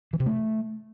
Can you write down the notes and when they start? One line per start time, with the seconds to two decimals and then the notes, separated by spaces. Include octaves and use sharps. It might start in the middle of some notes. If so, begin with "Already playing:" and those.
0.13 E3
0.20 C3
0.26 A3